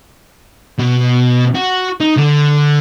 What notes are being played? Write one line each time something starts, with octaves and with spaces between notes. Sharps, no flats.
B2
F#4
D#4
D3